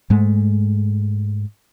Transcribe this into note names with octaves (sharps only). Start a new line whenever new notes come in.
G#2 G#3 A3